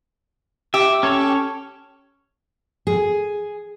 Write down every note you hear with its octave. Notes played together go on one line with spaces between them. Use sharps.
G4 E5
C#4 A4 C#5
G#4